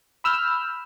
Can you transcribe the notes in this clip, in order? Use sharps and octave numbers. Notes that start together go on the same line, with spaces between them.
B5 E6 F6 G6